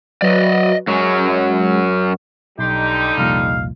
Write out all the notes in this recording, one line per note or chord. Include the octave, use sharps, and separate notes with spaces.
F#3 F#4 B4 D5 D#5
F#2 F#3 G#3
B1 D3 G3 D#4 G4 C6
C2 F2 A#2 F5